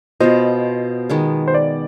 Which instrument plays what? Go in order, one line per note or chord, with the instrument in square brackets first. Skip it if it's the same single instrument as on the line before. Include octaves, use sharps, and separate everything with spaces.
[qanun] B2 B3 F4 [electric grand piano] C5 D#5
[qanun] D#3 G#3 B3
[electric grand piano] C5
D5